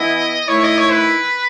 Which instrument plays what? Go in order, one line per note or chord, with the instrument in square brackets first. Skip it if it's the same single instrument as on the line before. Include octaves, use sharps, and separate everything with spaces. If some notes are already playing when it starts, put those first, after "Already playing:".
Already playing: [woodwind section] E3 B3 E4 [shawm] D#5
[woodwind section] D#3 A3 E4 [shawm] C#5
[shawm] D#5
C#5
B4